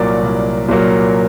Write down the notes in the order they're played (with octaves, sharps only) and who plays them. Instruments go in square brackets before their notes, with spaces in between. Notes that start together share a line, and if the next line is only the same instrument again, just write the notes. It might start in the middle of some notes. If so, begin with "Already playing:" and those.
Already playing: [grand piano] C2 A#2 F#3 A#3 A#4 D5
C2
A#2 F#3 A#3